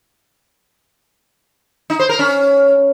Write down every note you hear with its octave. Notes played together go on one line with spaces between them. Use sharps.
D#4
C5
A#4
C#4